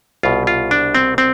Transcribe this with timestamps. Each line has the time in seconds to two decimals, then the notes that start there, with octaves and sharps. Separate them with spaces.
0.23 C2 B2 F4
0.47 F4
0.71 D4
0.95 C4
1.18 C4